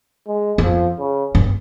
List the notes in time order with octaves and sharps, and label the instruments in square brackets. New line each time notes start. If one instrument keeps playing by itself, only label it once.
[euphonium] G#3
[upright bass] G2
[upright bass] F2 [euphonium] F3
[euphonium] C#3
[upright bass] G2